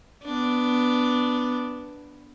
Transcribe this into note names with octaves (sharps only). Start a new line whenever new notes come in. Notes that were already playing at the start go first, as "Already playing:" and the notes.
B3 D4